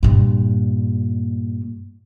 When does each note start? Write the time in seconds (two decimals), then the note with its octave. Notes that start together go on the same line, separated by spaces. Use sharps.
0.03 G2 A#2